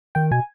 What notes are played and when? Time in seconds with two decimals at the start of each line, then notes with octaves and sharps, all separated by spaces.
0.15 D#3 G5
0.31 B2 G#5